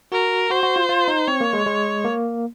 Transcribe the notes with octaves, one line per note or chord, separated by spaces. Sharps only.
F#4 A#4
F#4 C5
F#4
F4
F4
D#4
C4 C#5
A#3
G#3
G#3
A#3